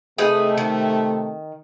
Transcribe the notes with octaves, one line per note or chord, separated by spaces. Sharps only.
C3 A3 D#4 G#4 B4
D#3